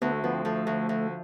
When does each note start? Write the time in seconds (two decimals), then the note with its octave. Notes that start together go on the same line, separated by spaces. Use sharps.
0.02 D2 B3
0.12 A3
0.23 F3 B3
0.34 C4
0.45 F3 A3
0.67 D2
0.89 D2